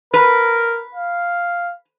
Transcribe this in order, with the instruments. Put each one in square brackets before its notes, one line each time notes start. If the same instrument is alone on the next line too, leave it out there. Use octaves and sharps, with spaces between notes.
[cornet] A#4 [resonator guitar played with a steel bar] B4
[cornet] F5